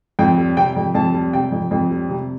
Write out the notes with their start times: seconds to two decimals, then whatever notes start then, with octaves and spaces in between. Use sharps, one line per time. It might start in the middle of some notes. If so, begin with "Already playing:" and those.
0.19 F2 G5
0.38 G3
0.57 C3 G5
0.76 F2
0.94 F2 A5
1.14 G3
1.33 C3 G5
1.52 F2
1.71 F2
1.91 G3
2.09 C3